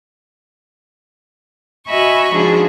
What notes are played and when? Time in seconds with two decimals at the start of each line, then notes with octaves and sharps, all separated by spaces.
1.89 F#4 D#5 E5 G#5 B5 C#6
2.33 G#2 F3 D4 F#4 G#4